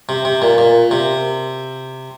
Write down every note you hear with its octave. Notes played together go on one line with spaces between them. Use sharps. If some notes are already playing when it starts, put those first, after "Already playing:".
C3
C3
A#2
A#2
C3